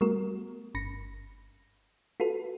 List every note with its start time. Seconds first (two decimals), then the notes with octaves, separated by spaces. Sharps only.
0.01 G3 A3 B3 F#4 A#4
0.75 G1 B5 A#6 C#7
2.20 F4 F#4 A4 B4